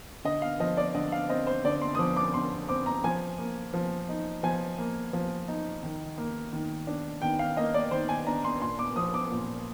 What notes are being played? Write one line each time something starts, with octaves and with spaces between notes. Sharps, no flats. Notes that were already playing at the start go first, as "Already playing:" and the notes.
D3 D#5
F5
F3 D#5
D5
D3 D#5
F5
C4 D#5
C5
D3 D5
C6
D#6
F3 D6
D6
D3 C6
C4 D6
A#5
F3 G#5
A#3
F3
D#4
F3 G#5
A#3
F3
D#4
D#3
A#3
D#3
D4
D#3 G5
F5
A#3 D#5
D5
D#3 C5
G#5
D4 A#5
C6
A#2 C6
D6
F3 D#6
D6
A#2